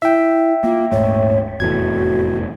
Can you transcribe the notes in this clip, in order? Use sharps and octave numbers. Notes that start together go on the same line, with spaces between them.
E4 E5 G5
A#3 F4
D#1 G#2 A3 C#5
F1 E2 A2 F#4 G#6